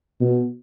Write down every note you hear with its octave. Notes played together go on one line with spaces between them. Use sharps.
B2